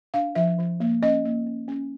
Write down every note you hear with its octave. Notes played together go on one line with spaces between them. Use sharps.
D4 F5
F3 E5
F3
A#3
C#4 D#5
A#3
C#4
C#4